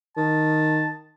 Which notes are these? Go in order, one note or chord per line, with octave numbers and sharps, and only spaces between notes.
D#3 A5